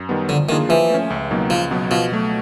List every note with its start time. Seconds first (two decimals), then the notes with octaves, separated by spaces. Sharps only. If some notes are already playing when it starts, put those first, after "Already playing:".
Already playing: F#2
0.09 D#3 G3 B3
0.29 D3 F3
0.49 D#3 A#3 D4 F4 G#4
0.69 E3 F3
0.90 A3 C#4
1.10 C#2
1.31 B2 F#3 A#3 D#4
1.50 C#2 F3
1.71 B2 F#3 B3
1.91 B2 F3
2.12 F#3 A3